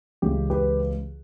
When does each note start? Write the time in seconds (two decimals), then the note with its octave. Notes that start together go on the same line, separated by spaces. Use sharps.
0.22 C#2 C#3 E3 G4
0.50 G4 B4